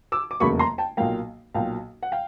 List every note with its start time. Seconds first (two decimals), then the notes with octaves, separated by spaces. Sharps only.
0.12 D6 E6
0.31 D6
0.40 F1 E2 C#3 F#3 A#3 B5 C#6
0.59 A#5 C6
0.78 G5 A5
0.97 B1 A#2 F#3 A#3 F5 G5
1.54 B1 A#2 F#3 A#3 F5 G5
2.03 F#5
2.12 F5 G5